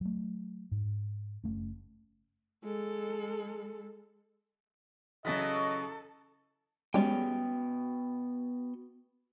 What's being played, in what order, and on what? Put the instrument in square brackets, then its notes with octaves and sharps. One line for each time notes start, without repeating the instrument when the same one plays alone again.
[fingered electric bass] F#3 A3
G#2
F#1 A3 C#4
[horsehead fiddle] G#3 A4
[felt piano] C#3 A6 B6 [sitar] E3 F#3 [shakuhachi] A4 [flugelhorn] D#5
[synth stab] G3 G#3 C#4 [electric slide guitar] B3 F#4 G5